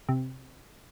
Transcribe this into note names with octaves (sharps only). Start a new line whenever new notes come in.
C3